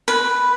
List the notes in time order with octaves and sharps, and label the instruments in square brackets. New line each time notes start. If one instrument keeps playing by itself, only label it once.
[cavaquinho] B4